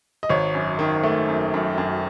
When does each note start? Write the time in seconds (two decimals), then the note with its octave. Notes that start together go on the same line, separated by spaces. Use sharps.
0.23 D#5
0.30 G#1 C#5
0.55 F#2
0.79 D#3
1.03 A3
1.28 F#2
1.54 F#2
1.78 F#2